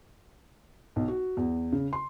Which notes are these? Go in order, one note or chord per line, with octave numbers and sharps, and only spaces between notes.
B1
F#4
E2
C#3
C6